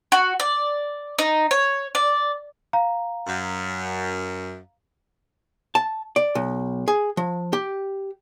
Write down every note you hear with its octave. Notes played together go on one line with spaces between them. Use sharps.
F#4
D5
D#4
C#5
D5
F5 A#5
F#2
A5
D5
B1
G#4
F3
G4